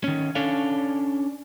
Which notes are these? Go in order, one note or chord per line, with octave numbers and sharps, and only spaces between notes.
D#3 C#4
C#4 D4 A4 C#5 F5